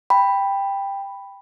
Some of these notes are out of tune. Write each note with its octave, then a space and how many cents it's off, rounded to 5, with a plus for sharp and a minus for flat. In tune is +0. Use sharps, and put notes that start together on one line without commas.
G5 +10 B5 +0